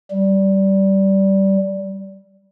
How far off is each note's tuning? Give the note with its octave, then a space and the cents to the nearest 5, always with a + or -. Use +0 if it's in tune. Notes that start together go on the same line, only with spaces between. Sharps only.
G3 -15